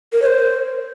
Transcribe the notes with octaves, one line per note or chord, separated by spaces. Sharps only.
A#4
C#5
C5